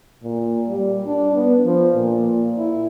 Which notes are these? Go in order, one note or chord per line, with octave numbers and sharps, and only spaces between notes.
A#2
G3
D4
B3
F3
A#2
E4